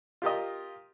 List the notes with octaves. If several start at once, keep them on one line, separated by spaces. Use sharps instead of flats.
F4 G4 A#4 D#5